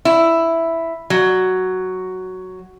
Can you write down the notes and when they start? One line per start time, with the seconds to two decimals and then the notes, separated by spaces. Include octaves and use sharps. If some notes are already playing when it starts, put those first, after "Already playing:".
0.05 E4
1.10 F#3